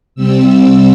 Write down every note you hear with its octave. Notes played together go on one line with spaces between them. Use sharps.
C3 G3 C4 E6